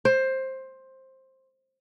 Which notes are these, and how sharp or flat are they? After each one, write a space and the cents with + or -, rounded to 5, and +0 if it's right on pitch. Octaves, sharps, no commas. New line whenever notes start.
C5 +15